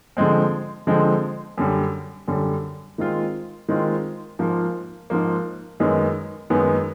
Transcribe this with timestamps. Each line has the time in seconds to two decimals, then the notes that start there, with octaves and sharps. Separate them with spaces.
0.17 D3 F3 G#3 C4
0.87 D3 F3 G#3 C4
1.58 F#2 D3 G3
2.28 F#2 D3 G3
2.98 D#3 G#3 C4 F4
3.69 D#3 G#3 C4 F4
4.39 G#2 F3 A#3
5.10 G#2 F3 A#3
5.80 F#2 D#3 G#3 B3
6.50 F#2 D#3 G#3 B3